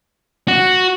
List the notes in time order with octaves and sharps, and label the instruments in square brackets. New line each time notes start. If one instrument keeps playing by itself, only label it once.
[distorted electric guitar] F#4